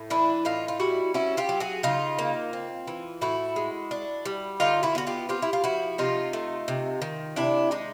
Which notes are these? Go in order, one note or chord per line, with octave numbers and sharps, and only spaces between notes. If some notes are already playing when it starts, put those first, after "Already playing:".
Already playing: A2
E3 D4 E4
A2 D#4 F4
F4
G3 E4 F#4
C#4 E4 F#4
F4 G4
F#3
F#4 G#4
C#3 D#4 F4
A#3
C4
E3
A2 E4 F#4
G#3
D4
G3
D3 D#4 F4
E4 F#4
B3 F#4
F4 G4
C4 F4 G4
E4
F4
F3 E4 F#4
C3 D#4 F4
A3
C3
D#3
C3 D4 E4
G#3 D#4